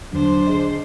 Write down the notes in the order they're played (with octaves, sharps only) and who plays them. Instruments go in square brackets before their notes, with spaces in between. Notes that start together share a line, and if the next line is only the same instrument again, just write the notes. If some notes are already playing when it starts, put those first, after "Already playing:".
[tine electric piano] E2 D3 F#3 [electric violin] D4 C5
[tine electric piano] G#4 D#5